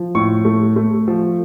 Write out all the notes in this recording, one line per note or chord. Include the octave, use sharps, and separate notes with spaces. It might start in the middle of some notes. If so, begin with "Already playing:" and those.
Already playing: F3
A2 C#6
A3
A3
F3